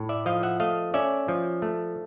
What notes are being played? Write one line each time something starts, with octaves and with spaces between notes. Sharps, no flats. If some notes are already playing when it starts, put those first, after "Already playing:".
Already playing: A2
D5 E5
F3 D#5 F5
E5 F#5
A3 D#5 F5
C#4 D5 E5
F3
A3